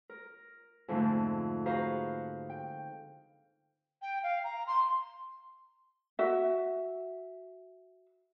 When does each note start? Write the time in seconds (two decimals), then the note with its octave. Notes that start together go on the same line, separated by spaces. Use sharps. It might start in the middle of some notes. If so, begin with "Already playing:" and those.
0.09 A#4
0.88 F2 G#2 D3 A3 A#3 D#4
1.66 F#4 G#4 B4 C5 F5 A#5
2.49 G5
4.02 G5
4.23 F5
4.44 A#5
4.67 C6
6.19 F#4 E5